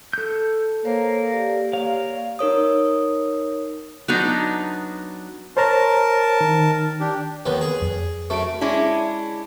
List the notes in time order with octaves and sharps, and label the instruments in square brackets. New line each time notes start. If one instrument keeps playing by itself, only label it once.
[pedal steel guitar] A4 G6
[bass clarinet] A#3 [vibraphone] A#4 C5 C#5
[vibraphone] G4 D5
[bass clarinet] A#3 [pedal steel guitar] C#5 F5
[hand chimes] D#4 A#4 C#5 D#6
[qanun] F#3 B3 D4 D#4
[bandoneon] A#4 A5 [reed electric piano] C5 C#5 A#5
[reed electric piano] D#3
[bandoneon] D4 G4
[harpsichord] D#2 D#3 B3 [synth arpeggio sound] C#5
[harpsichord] G#4
[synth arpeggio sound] F2
[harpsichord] F#2 A3 [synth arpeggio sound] C#6 D7
[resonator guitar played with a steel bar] G#3 C#4 D4 E4